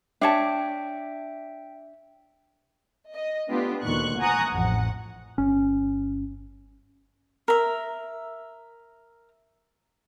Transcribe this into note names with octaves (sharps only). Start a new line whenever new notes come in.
D4 C#5 E5 G5 A5
D#5
A3 B3 D4 F4 G4
D2 A#2 D#3 C#6 F#6
F#5 G#5 A#5 C#6 D#6 F#6
A1 F2 F#5
G1 C#4
A#4 E5